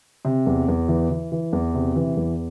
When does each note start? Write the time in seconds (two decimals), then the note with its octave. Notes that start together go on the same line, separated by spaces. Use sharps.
0.25 C3
0.46 E2
0.68 E2
0.88 E3
1.10 E3
1.32 E3
1.53 E2
1.75 C3
1.96 E3
2.17 E2